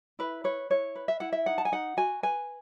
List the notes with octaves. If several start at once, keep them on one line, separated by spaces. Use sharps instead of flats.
E4 B4
B4 C#5
E4 C#5
B4
E5
E4 F#5
E5
D#4 F#5
A5
G#5
D#4 F#5
F#4 G#5
B4 G#5